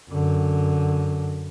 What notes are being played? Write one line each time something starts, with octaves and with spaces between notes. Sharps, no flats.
F#2 D3